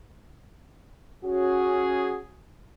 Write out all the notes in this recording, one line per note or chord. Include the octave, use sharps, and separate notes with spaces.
C#4 F#4 G#4